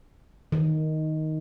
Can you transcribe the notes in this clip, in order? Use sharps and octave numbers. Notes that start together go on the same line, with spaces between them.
D#3